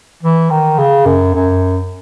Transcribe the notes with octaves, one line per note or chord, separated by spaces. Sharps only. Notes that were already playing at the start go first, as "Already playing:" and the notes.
E3
D#3
C#3
F#2
F#2